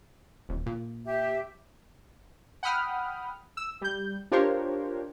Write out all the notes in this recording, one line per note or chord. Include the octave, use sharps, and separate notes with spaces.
D#1
A#2
G4 E5
F#5 G5 B5 D#6 F6
E6
G3 G6
D4 F4 G4 A#4 C5 C#5